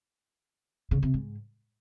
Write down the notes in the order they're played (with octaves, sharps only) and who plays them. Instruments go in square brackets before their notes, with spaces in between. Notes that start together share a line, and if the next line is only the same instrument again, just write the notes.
[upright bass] C#3
C3
G#2